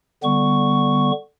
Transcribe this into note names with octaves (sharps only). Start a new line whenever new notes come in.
D3 G3 B3 C#6